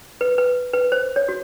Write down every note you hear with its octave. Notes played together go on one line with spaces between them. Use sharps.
B4
B4
B4
C5
C#5
F#4